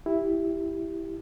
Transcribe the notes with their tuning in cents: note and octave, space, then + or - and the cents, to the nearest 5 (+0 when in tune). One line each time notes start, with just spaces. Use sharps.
E4 +0 G4 +0